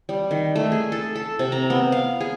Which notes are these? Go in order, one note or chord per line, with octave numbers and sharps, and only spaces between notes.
G3
D#3
A3
G#4
A4
A4
C3
A#5
B3
F5
G#4